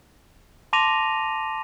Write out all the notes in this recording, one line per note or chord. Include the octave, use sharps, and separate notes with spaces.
A5 C6 D6 A#6 D#7 F7